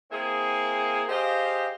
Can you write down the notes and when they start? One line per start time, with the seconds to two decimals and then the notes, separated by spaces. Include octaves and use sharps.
0.11 A#3 C4 E4 G#4
1.08 G4 G#4 C5 D#5 F5